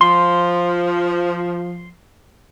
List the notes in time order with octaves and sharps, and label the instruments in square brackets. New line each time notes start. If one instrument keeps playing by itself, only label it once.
[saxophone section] F3 [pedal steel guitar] C6